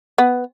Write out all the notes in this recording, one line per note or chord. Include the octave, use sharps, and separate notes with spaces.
B3